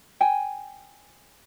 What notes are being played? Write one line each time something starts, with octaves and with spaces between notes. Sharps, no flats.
G5 G#5